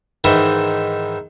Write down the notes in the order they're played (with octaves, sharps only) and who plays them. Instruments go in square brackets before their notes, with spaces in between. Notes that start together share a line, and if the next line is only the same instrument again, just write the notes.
[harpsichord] G#2 D#3 E3